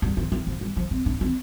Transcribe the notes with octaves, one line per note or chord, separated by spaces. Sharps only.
G2
F3
E3
F3
G3
F3
C4
D4
C4